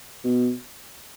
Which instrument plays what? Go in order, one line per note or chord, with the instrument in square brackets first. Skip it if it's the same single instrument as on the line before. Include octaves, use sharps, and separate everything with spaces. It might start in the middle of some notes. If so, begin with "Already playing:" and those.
[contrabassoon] B2